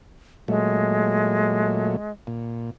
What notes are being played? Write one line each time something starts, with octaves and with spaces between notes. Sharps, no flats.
A#2 F#3 G#3 A3
A#2